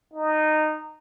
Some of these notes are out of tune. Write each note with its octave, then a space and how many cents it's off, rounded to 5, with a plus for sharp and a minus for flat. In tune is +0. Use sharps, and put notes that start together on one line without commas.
D#4 -15